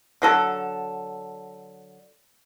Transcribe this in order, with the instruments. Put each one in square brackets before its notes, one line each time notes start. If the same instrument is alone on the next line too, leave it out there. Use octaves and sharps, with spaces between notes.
[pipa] D3 F#3 A4